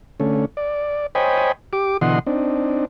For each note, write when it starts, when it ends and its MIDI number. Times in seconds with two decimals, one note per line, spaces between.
0.20 0.45 50
0.20 0.45 57
0.20 0.45 61
0.57 1.06 74
1.15 1.52 72
1.15 1.52 73
1.15 1.52 75
1.15 1.52 79
1.15 1.52 80
1.15 1.52 83
1.73 1.97 67
1.73 1.97 86
2.01 2.19 47
2.01 2.19 50
2.01 2.19 52
2.01 2.19 75
2.01 2.19 78
2.01 2.19 84
2.27 2.85 60
2.27 2.85 62
2.27 2.85 63